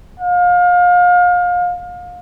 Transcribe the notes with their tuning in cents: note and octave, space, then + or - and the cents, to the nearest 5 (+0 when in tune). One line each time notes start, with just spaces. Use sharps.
F5 +30